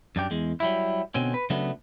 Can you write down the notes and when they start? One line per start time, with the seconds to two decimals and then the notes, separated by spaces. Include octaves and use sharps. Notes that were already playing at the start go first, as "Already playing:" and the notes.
0.16 F#2 D4 G4
0.31 E2 G#3
0.60 F#3 G3 E4
1.14 B2 D3 C4 C#4
1.34 B4
1.50 C#3 F#3 A3 B3 D4